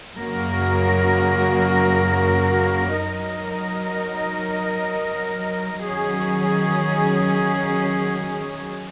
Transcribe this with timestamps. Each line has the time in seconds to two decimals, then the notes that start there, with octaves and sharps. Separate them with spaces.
0.17 F#2 C#3 A#3 F#4 A#4
3.00 F#3 D#4 A#4 D#5
5.83 D#3 F#3 C#4 G#4